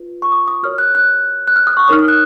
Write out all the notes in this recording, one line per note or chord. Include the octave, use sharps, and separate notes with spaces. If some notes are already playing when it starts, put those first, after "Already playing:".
Already playing: F4 B4
C#6
D#6
D#6
F#4 A#4 C#5 F6
F#6
F#6
F#6
F6
D#6
C#6
D#4 A#4 C#5 D#6 F6
D#6
F#6